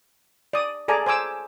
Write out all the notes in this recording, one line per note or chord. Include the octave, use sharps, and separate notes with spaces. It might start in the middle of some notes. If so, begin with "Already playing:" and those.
D5 D#6
G#4 A4 D5 G#5 A#5
C5 G#5 D6 E6